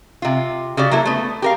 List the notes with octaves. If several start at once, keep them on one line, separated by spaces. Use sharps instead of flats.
C3 F4
C#3 F#4 G4 D5
F#3 A#3 E4 A4
A3 B3
G4 A#4 F5